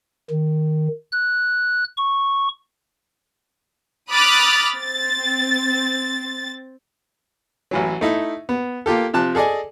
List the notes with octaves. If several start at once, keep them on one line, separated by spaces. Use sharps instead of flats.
D#3
F#6
C#6
B5 D6 D#6 F6 F#6 A6
C4 A6
A1 E3 F#3
A3 D#4 E4
B3
A#3 F4 G4 A4
C3 F3 A5 F#6
G#4 A4 D5 D#5 G#5